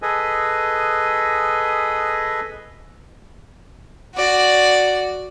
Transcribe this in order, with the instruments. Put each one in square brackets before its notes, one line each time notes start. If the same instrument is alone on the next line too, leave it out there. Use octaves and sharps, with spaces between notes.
[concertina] G#4 A4 B4 D#5 G#5
[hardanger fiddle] F#4 D5